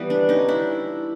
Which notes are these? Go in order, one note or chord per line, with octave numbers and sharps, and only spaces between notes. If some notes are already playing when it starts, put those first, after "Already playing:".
Already playing: E3 G3 B3
D4
C#4 D#4
D4 E4